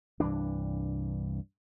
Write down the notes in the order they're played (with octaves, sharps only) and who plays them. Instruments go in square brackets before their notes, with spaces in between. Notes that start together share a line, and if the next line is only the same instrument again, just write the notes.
[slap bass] C2 G2 E3 D4